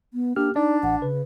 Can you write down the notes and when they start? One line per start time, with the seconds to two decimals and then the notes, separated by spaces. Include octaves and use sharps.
0.14 B3
0.36 A#3 D4 G4 F6
0.56 D4 D#4 D5
0.83 A1 F#5
1.02 C#3 B4